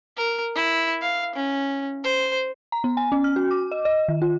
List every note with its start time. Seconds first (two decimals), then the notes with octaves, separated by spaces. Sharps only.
0.17 A#4
0.55 E4
1.02 F5
1.35 C#4
2.04 C5
2.72 A#5
2.84 B3
2.97 G#5
3.12 C#4
3.24 F6
3.36 F#4
3.51 D6
3.72 D#5
3.85 D#5
4.08 D#3
4.22 F4